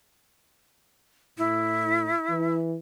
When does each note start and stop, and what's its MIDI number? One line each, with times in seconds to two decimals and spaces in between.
1.38 2.12 45
1.38 2.56 64
2.30 2.77 52